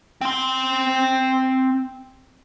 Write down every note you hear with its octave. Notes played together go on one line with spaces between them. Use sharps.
C4 C6